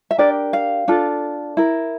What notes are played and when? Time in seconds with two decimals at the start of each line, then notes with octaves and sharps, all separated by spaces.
0.11 E5
0.18 D4 G4 A#4 D5
0.53 F5
0.88 D4 F4 A4
1.57 E4 A#4